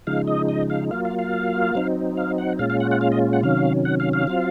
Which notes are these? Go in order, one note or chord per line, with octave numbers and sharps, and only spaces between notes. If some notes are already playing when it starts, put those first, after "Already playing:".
C#3 F3 G#3 D#4 F5
D#5
D#5
F5
F#3 A#3 F4 F5
F5
F5
F#3 C4 D#4
F5
F#5
A#2 G#3 C#4 F4 F5
F5
F#5
F#5
F5
D#5
F#5
C3 D#3 F#3 C#4 F5
F#5
F5
F5
F#3 C4 F4